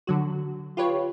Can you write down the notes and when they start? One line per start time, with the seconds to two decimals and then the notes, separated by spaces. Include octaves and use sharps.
0.07 D3 F#3 F#4
0.77 F4 G4 B4 C#5